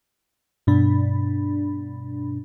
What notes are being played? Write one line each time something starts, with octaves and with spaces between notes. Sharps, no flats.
G2 B2 D4 B5